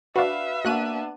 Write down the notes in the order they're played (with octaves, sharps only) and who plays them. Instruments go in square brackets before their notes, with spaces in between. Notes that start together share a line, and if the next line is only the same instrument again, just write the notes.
[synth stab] D4 F#4 [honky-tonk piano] B4 F5 [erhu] E5
[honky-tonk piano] A#3 [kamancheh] B3 D4 [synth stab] F#4 F#6 D#7